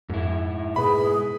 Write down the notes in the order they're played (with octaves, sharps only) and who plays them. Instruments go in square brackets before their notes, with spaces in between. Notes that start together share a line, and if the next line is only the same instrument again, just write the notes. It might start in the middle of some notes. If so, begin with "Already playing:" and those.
[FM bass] F2 [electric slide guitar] G#2 E4
[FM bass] B2 [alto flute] G#4 [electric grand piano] B4 B5